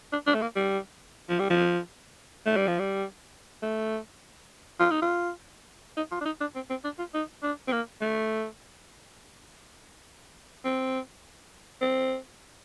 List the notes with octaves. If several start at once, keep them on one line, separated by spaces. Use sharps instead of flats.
D4
D4
A3
A#3
G3
F3
G3
F3
A3
G3
F3
G3
A3
F4
D#4
F4
D#4
F4
D4
D#4
D4
C4
C4
D4
F4
D#4
D4
C4
A#3
A3
C4
C4